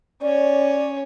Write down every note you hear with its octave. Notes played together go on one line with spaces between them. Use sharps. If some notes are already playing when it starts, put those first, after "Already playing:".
C#4 C#5 D5